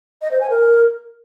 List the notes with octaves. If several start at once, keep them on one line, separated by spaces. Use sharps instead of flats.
D#5
C5
G#5
A#4